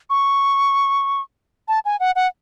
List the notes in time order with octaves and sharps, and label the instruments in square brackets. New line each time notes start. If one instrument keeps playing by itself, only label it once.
[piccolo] C#6
A5
G#5
F#5
F#5